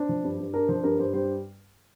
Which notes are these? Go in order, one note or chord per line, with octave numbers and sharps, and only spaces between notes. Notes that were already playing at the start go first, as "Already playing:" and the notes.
Already playing: D4 C5
F3
G2
G2
D4 A#4
F3 C5
G2 A#4
G2 C5
G3 C5